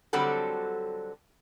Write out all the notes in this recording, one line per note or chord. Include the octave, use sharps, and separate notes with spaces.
D3 F#3 G3 C4 F#4 A4